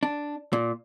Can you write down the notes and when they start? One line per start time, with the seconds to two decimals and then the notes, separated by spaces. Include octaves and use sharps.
0.03 D4
0.53 A#2